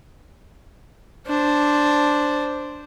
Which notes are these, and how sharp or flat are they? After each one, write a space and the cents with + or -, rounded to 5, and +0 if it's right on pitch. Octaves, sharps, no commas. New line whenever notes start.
D4 +0 C5 +0